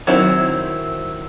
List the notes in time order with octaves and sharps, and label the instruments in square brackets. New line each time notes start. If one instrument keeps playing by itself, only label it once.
[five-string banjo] D#3 F#3 C4 E4